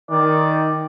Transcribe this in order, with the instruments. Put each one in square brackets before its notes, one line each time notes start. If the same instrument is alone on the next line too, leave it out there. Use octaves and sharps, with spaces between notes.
[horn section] D#3 [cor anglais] D5